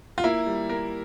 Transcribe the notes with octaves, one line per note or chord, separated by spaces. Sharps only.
F4
A#3 E4
G3
A#3 A#4